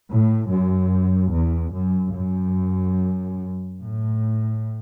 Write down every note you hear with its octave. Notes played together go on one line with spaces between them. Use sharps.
A2
F#2
E2
F#2
F#2
A2